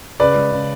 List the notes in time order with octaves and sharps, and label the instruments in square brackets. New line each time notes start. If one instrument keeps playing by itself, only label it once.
[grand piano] C#3 B4 D5
G#3
C#3